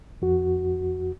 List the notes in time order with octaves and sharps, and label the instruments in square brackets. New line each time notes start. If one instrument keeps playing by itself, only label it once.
[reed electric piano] F2 F#4